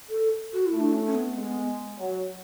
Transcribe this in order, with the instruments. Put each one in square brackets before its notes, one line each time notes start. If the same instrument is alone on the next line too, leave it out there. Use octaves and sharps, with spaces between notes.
[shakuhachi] A4
F#4
E4
[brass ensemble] A3
[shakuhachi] D4
C#4
C#4
B3
[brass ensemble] G#3
F#3